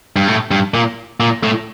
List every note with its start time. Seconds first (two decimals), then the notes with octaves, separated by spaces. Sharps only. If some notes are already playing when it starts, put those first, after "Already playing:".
0.16 G2
0.28 A2
0.51 G2
0.74 A#2
1.20 A#2
1.43 A2